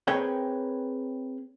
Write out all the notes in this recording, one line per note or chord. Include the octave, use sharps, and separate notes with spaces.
C4 G#4 A#4 B4 C#5 G5